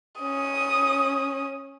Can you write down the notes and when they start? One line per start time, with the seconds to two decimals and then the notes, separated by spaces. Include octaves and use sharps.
0.21 C#4 D#6